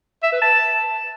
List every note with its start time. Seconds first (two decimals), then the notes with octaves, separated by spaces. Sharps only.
0.23 E5
0.32 B4
0.42 A5